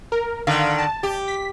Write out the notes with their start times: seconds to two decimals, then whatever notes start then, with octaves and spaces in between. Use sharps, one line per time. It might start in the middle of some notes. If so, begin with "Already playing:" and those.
0.12 A#4
0.47 D3 D#3 F5
0.78 A5
1.03 G4
1.28 B6